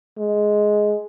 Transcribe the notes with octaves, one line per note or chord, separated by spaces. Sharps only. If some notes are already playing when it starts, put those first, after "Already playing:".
G#3